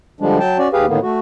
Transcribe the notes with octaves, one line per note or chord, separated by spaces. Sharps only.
D3 F3 G3 G#3 D4
F#3 G5 A5
C#4 F#4 D5
D#2 G4 G#4 B4 F5
A2 D3 D#3 A#3 B3
A3 F#4